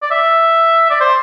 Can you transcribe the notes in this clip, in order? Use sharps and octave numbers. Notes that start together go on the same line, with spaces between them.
D5
E5
D5
C5